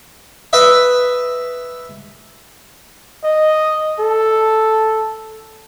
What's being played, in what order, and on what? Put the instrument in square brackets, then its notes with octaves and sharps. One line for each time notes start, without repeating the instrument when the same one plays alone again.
[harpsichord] B4 D#5 E5
[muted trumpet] D#5
A4